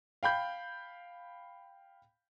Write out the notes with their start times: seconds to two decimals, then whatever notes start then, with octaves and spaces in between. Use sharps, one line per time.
0.23 F5 G5 B5 G6